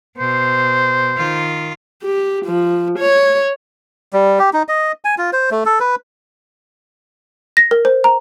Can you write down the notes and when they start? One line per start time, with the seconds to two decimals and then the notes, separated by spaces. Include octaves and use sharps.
0.19 B2 C5
1.17 D#3 F4
2.03 G4
2.45 F3
2.98 C#5
4.13 G3
4.39 G4
4.53 D#4
4.68 D#5
5.05 G#5
5.18 F4
5.33 C5
5.51 A3
5.65 A4
5.80 B4
7.57 A#6
7.71 A#4
7.85 C5
8.04 A#5